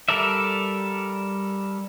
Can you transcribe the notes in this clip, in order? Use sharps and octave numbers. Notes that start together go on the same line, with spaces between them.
G3 A4 A#4 D5 E5